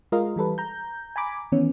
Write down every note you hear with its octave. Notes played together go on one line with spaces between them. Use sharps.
G#3 F4 A#4 D#5 F5
E3 G3 A4 B4
A#5 G6
G#5 A#5 B5 D6
D#3 E3 B3 C#4